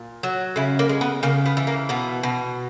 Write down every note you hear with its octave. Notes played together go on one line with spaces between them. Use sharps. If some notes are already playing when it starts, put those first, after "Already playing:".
Already playing: A#2
F#3
C#3 E4
A#3
G#3
B3
C#3 A#3
B3
E3
A#3
B2 B3
B2